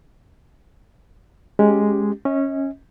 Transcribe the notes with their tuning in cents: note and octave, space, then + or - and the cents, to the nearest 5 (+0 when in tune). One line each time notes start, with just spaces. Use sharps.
G#3 +0 C#4 +0 G4 +0
C#4 -15 D#5 +40